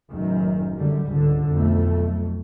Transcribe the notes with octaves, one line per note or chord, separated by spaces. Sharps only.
F#1 F#2 A2 D#3
F#2 D3 G3
C#2 G#2 D3
B1 F2 A3